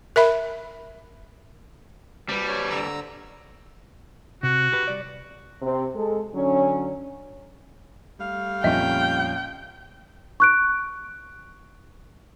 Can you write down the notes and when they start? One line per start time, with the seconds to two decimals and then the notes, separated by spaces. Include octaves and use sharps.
0.16 A#4 E5 B5
2.29 C3 G3 B4
2.48 C#5
2.70 D3 A#5 E6
4.43 C3 F#4
4.72 G4 B4
4.88 G3 D5
5.62 C3 C4
5.95 G#3 A4
6.34 D3 F#3 C#4
8.19 G3 A3 F5
8.64 F2 A#2 C#4 D#5 E5 G5
10.40 C#6 F#6 D7